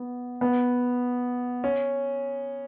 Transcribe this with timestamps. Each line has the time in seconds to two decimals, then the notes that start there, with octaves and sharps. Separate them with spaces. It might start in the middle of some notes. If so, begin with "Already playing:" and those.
Already playing: B3
0.41 B3
1.64 C#4